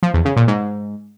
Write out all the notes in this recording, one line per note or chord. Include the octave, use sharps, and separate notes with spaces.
F3
E2
C#3
A#2
G#2